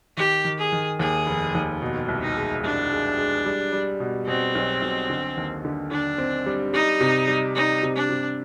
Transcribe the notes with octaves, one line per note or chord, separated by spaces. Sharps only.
D#3 G4
D#3
G#4
D#3
D#2 G#4
F1
D#2
B2
C2
D#4
G#3
C2 D4
G#3
G#3
G3
G3
B2
B2 C4
B1
B1
D3
D#2
D3
D3 D4
C4
G3
G3 D#4
C3
G3
G3 D#4
C3
D4
C3